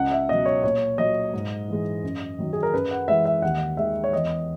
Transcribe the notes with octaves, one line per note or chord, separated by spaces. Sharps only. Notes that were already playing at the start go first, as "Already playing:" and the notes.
Already playing: C#2 F#5
E5
B2 F#3 D#5
C#5
A#2 C#5
F#3 D#5
G#2
E3 G#3
F#2
D#3 F#3
G#4
A#4
F#2 B4
F#5
E3 G#3 E5
E5
D#2 F#5
D#3 G#3 E5
C#5
E2 D#5